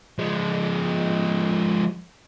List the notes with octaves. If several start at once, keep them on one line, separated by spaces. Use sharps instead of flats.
F3 G#3